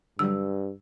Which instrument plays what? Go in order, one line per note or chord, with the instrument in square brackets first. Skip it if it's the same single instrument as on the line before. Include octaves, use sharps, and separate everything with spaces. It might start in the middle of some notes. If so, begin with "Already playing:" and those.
[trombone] G2 [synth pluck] D3 F#3 G3 [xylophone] E6